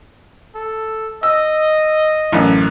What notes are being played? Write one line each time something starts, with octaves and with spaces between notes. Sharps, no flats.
A4
D#5 E6
A1 F#2